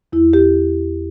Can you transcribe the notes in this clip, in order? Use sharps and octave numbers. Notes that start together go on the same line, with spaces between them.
E2 E4
G4